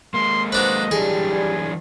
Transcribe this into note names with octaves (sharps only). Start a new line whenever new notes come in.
G#3 A#3 C6
F#3 D4 B4 C5 D#5
E3 F#3 G3 D4 G#4
G#5